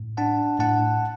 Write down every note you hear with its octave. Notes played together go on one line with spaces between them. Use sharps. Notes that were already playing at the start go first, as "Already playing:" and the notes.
Already playing: A2
D4 F#5 A5
A2 F#5 A5